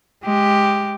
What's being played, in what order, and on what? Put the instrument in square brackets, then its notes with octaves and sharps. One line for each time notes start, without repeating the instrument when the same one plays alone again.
[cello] G#3 G4